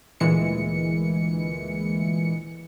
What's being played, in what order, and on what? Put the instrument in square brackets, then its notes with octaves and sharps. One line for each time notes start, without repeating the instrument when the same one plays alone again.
[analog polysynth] D2 A#2 E3 G#3 C#7